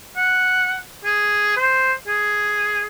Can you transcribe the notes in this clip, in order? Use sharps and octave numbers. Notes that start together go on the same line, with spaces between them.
F#5
G#4
C5
G#4